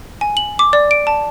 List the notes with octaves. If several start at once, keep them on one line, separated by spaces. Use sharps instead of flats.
G#5
F#7
D6
D5
D7
A5